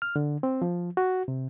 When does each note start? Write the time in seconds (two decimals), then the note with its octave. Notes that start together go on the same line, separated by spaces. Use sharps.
0.02 F6
0.16 D3
0.43 C4
0.62 F3
0.97 F#4
1.28 C3